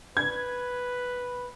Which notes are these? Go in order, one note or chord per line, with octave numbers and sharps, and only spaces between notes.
B4 G#6